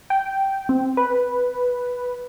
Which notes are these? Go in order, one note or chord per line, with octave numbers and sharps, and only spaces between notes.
G5
C4
B4